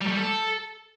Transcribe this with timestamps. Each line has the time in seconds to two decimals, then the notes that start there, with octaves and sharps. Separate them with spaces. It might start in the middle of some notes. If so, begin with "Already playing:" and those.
0.01 G3
0.06 A3
0.12 G3
0.17 A4